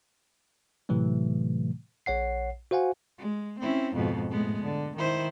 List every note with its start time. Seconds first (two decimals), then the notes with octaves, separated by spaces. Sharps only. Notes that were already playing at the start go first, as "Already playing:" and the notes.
0.89 A2 C3 E3 F#3 A3
2.06 A#1 C#5 F#5 C7
2.71 F#4 C5 F5 F#5 G#5
3.18 G#3
3.59 C4 C#4 E4
3.94 F2 G#2 B2
4.30 A2 G#3 B3
4.64 D3
4.97 D#3 E4 C5